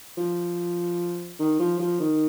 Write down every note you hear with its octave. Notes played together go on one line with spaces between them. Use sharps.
F3
D#3
F3
F3
D#3